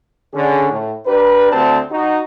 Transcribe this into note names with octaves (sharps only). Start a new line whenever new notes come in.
D3 C#4 G#4
A2
D4 G4 A#4 B4
D2 C4 A5
D#4 F#4